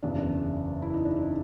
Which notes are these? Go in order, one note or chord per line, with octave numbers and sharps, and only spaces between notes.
F#1 E2 C#3 D4
E4
D#4
D4
D#4